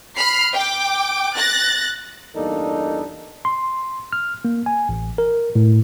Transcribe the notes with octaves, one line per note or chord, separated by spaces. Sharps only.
B5 F6 C7
G5 D6
F#6 A6 A#6
E2 G2 A#3 D4 D#4 A4
C6
F6
A#3
G#5
A1
A#4
A2